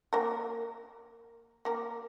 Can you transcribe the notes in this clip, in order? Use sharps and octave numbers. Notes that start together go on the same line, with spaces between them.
A#3 A#4
A#3 A#4